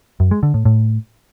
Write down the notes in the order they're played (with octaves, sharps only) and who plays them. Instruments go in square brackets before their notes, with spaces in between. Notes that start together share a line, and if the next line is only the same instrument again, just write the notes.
[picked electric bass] F#2
G#3
D3
A2
A2